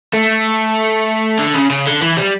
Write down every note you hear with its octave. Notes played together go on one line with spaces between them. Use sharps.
A3
D3
C#3
C#3
D3
E3
G3